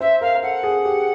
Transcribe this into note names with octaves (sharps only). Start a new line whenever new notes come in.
C5 E5
A#4 F5
A#4
A4 F#5
G#4
G4